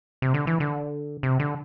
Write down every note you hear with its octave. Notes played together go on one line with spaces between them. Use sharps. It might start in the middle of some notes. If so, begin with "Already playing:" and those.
C3
D3
E3
D3
C3
D3